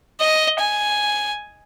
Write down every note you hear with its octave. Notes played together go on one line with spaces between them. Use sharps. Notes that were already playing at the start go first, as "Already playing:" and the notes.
D#5
G#5